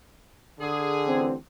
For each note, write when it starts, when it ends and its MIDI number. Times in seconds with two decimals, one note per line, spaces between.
0.60 1.35 50
0.60 1.25 68
1.06 1.33 33
1.06 1.33 60